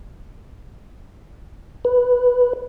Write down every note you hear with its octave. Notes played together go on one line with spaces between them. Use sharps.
B4